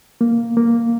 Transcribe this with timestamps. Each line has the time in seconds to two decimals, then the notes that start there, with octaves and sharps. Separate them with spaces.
0.21 A#3
0.57 A#3